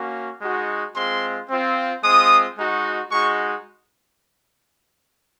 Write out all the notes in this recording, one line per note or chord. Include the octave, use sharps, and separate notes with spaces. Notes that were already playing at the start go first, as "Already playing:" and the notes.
Already playing: A#3 C#4 F#4
G#3 D#4 F#4
G#3 C4 F4 C6
C4 F4
G#3 C4 F4 D#6
G#3 D#4 F#4
G#3 D#4 F#4 C#6